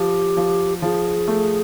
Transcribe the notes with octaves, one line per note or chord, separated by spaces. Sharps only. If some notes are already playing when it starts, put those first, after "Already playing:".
Already playing: F3 G4
F3
F3 G#4
A3